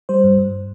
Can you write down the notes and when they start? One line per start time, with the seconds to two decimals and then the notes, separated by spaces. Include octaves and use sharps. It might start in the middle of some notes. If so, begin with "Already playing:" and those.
0.09 G3 C5
0.24 G2
0.38 G2